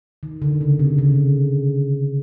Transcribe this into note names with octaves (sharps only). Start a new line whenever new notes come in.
D#3
D3
C#3
C3
C#3